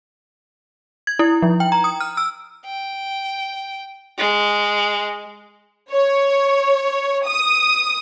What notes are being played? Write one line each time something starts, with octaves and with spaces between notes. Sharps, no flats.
G#6
E4
F3
G5
A#5
D#6
F6
E6
G5
G#3
C#5
D#6